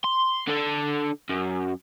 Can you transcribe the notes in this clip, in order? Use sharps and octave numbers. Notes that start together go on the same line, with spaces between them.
C6
D3 A4
F#2